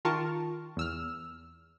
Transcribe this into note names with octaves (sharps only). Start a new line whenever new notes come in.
D#3 F4 A#4 A5 C#6
E2 E6 F6